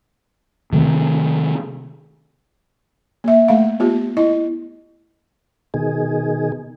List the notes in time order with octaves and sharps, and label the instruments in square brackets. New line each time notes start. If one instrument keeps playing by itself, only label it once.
[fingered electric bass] C3 D#3 A3 C4
[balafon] A#3 E5
A3 F5
B3 F4 G4
E4 D#5
[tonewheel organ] B2 D#3 G#4